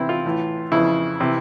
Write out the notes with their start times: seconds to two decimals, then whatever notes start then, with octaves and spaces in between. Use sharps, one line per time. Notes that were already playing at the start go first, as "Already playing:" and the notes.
Already playing: E2 C3 E3 C4 E4
0.09 F4
0.25 A2 E3
0.72 F2 C#3 E3 E4
1.20 C3 E3